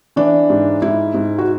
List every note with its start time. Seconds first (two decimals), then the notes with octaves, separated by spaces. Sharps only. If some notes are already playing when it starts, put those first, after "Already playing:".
0.16 E3 D4
0.50 G#2
0.82 G#2 E4
1.14 G#2
1.38 F#4